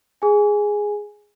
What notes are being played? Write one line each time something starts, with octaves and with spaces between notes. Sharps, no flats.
G#4 G#5